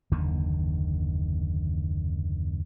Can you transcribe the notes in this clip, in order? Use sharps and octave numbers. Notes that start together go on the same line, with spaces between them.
F#1 D#2 D3 D#3